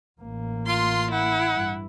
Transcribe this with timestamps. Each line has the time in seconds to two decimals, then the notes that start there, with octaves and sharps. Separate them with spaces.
0.21 A1 A#3
0.67 F4 C6
1.12 E4 F#5
1.54 G2